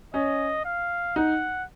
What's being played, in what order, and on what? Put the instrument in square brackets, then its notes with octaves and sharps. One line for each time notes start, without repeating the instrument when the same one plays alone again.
[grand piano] C#4 [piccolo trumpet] D#5
[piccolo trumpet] F5
[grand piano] D#4 [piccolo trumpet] F#5